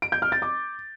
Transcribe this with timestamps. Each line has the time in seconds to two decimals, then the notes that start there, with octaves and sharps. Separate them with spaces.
0.02 D7
0.12 G6
0.22 F6
0.32 A6
0.42 D6